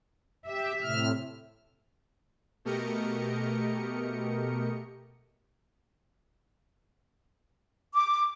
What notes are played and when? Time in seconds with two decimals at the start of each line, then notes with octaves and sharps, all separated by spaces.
0.47 G4 E5
0.82 A2 C3 F6
2.65 B2 A3 G4 A#4 D#5 C#7
7.95 D6